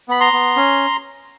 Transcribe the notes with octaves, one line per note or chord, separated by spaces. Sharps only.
B3 B5
A#5 C6
B3
C#4